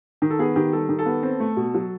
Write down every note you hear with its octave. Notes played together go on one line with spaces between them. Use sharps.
D#3
A4
B3 G#4
D#3 G4
G3 A4
D#3
A4
B3
C4
A3
B2
F#3